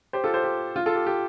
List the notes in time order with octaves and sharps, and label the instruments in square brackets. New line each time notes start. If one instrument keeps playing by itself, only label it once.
[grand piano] G4 C5
F4 A4
G4 C5
G4
F4
F4 A4
G4
G4